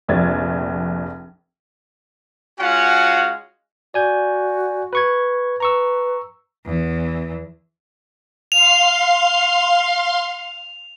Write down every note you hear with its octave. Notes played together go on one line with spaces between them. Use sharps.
F1 A#1 G#6 A6
G#3 C#4 F4 F#4 F5 F#5
F#4 D5 G#5 G6
B4 C#6 G#6
B4 A#5 C#6 E6
E2 E3
F5 C6 C7 F7